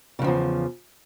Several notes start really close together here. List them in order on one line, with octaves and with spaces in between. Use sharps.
C#3 G2 F3 E2